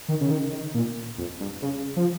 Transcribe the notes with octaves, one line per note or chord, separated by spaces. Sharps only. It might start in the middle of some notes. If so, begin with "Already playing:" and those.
D#3
C#3
D#3
D#3
A#2
F2
G2
C#3
F3